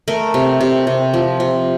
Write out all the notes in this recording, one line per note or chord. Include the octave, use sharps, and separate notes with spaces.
A3 A#4
C3
C3
C3
F3
C3